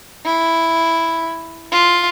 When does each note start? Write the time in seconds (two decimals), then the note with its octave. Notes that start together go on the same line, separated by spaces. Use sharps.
0.25 E4
1.72 F4